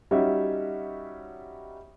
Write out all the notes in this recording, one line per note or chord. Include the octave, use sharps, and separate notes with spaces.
G3 C#4 D#4 F#4 C#5 E5